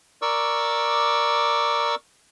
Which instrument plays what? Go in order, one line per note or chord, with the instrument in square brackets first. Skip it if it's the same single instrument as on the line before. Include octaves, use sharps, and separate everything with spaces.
[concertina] A#4 D5 C#6 D6 E6